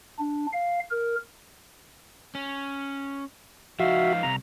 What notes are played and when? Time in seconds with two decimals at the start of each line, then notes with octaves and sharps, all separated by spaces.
0.19 D4
0.53 F5
0.91 A#4
2.35 C#4
3.80 F3 D#4 F#4 E5 F5
4.23 C2 C3 A#5